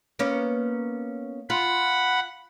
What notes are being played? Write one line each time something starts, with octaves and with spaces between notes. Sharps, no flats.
A#3 B3 C#4
F4 F#5 B5